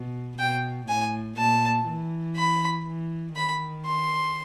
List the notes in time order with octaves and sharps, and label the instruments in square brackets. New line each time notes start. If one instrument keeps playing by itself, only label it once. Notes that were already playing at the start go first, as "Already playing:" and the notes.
Already playing: [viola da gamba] B2
[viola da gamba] B2 [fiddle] G5
[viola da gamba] A2 [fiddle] G#5
[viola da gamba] A#2 [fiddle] A5
[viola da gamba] E3
[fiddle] B5
[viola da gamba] E3
[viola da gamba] D#3 [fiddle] B5
[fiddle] C6